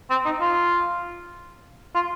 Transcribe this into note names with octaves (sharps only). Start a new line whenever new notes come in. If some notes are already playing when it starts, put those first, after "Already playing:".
C4
D#4
F4
F4